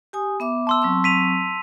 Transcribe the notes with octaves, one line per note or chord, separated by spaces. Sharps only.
G4 G#5 D#6
B3 E5 D6
A5 C6 E6
F#3 C4 C#6
B6 D#7 F7